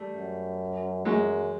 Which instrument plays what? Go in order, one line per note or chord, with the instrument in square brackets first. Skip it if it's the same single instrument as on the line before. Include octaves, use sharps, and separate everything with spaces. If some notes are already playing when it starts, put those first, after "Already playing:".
Already playing: [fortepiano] G3 A3
[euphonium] F#2
[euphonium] F#2 [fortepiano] F#3 G#3